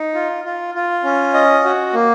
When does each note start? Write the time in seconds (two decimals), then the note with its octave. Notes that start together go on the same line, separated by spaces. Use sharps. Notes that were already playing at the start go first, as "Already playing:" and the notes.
Already playing: D#4
0.14 F4
0.45 F4
0.74 F4
1.04 C#4
1.34 D#5
1.64 F#4
1.93 A#3